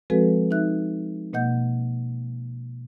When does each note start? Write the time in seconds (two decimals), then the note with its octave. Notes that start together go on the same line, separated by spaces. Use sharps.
0.10 F3 G#3 C4 F#4 A4 B4
0.51 D#4 E5 F#6
1.33 B2 A#3 D#5 F#5 G6